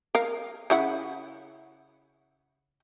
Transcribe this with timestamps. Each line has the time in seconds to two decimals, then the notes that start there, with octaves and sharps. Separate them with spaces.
0.15 A#4 F5
0.70 C#3 E4 F#5